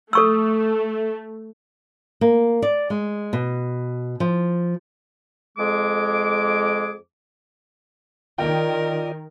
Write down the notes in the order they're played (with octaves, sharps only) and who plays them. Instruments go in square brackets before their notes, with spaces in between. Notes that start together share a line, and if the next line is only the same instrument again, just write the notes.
[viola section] A3 [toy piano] A4 C#6 E6
[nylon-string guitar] A#3
D5
G#3
B2
F3
[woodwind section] F2 G#3 G#4 D6
[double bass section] D#3 [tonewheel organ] F4 D5 D#5 [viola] A#4 [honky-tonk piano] G5